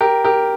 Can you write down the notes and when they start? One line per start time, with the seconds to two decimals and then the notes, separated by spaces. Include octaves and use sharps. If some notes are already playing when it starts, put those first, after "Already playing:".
0.01 G4 A#4
0.25 G4 A#4